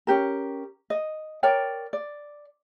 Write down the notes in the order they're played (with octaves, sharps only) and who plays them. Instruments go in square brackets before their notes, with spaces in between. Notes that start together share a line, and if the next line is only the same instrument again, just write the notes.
[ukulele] C#4 G4 A#4
D#5
A#4 C#5 D5 G5
D5